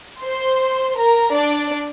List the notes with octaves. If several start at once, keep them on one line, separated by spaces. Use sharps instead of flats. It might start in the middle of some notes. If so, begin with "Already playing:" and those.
C5 C6
A#4 A#5
D4 D5